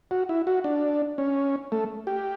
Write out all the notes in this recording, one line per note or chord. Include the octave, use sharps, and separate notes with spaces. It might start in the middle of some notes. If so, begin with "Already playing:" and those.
F#4
E4
F#4
D4
C#4
A3
G4